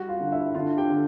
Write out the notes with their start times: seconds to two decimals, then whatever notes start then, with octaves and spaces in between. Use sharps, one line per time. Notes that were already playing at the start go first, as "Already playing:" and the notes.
Already playing: G3 F#4 F#5
0.09 F4 F5
0.20 D3
0.32 E4 E5
0.55 D3 F4 F5
0.77 G4 G5
0.89 D3